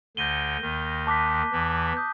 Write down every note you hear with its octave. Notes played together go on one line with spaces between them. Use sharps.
D2 D3 G6 A#6 D#7 G7
D#2 D#3
A5 D6 F#6 B6
E2 E3
D#6 G6